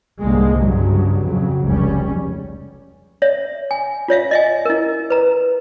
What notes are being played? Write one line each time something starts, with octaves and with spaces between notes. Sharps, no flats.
C2 G#2 D3 G#3 A#3
G2 C#3 F#3
F2 C#3 F#3
F1 C#2 G3 C#4
C#5 E5
G#5
F4 C#5 E5 F5
D#5 E5 G#5
E4 A#4
B4 A#5